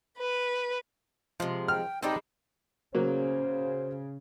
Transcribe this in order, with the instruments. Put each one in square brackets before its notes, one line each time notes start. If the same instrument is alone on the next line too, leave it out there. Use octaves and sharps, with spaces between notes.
[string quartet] B4
[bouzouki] C3 G#3 [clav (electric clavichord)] F3
[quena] G5 [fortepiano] F6
[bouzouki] G3 G#3 A4 [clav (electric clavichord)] C4 D5 G5 [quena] D#4
[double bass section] C#3 [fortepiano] F#3 A#3 [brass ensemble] F#4 C5